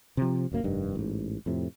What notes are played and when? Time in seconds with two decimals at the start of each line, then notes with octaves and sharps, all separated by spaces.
0.17 C3 F3
0.51 D1 F#2 A#3
0.64 F1 G2 D#3
0.95 A1 G#2
1.46 F2 A2 C3